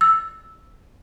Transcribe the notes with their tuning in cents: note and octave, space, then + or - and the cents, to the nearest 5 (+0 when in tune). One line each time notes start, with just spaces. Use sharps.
E6 +0